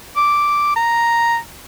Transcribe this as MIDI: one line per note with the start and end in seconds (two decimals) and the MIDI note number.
0.16 0.73 86
0.76 1.38 82